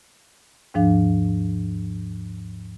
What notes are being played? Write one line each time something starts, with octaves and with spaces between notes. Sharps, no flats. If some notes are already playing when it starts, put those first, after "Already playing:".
D#2 G#2 F3 D4 F5